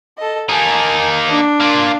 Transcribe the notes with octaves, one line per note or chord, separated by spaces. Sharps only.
A4 D#5
A#3 D#4 G#5 A5
D4
A#3 F4